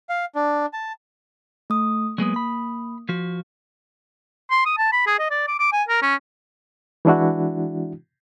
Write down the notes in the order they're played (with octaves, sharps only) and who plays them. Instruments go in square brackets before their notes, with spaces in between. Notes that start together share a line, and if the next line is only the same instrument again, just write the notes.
[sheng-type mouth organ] F5
D4
A5
[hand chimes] A3 D#6
[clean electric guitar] F#3 G#3 B3 [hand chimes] A#3 D#6
[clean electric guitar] B5
F3 F#4
[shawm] C6
D#6
A5
B5
G#4
D#5
D5
D6
D6
G#5
A#4
C#4
[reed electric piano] E3 G#3 D4 E4 F#4